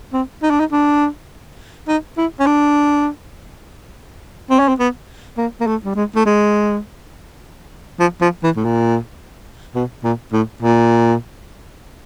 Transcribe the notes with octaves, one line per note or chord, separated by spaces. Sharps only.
C4
D#4
D4
D#4
D4
D#4
E4
C#4
D4
C4
C#4
C4
B3
A#3
A#3
A3
G3
G#3
A3
G#3
F3
F3
E3
A2
A#2
B2
A#2
A2
A#2